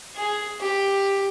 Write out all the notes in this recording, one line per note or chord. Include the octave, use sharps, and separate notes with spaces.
G#4
G4